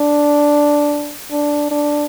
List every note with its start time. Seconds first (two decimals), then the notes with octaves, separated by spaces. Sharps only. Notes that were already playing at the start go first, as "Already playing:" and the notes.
Already playing: D4
1.31 D4
1.71 D4